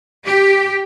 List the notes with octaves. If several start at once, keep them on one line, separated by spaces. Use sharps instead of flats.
G4